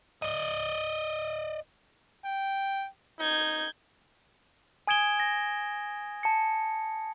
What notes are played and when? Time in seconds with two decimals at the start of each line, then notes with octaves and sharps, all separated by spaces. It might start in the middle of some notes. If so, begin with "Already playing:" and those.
0.22 D5 D#5
2.24 G5
3.19 D#4 G6 G#6
4.87 G#5 D#6 G#6 D7 E7 G7
5.20 A#6
6.23 A5 C#7